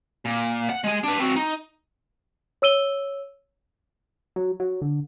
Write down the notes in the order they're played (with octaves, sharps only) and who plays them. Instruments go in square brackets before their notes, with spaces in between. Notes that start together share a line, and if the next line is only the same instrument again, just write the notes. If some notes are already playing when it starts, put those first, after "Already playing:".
[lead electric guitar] A#2
F#5
G#3 G#5
D4 B4
C4 F#4
D#4
[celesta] C#5 E6 D#7 G7
[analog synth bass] F#3
F#3
D3